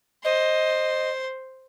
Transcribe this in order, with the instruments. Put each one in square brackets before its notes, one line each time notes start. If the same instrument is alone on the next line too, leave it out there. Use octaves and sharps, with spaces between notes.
[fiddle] C5 [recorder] D#5